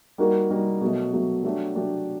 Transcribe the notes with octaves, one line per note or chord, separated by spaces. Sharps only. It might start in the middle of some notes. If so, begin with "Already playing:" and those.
G3 A#3 D#4 F#4 A#4
G3 A#3 D#4 F#4 A#4
B2 F#3 A3
B2 F#3 A3
F#3 A3 D4 G4
F#3 A3 D4 G4